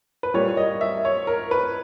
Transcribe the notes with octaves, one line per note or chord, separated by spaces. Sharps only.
B4
A#2 G3 A#3 C#5
D#5
E5
C#5
A#4
B4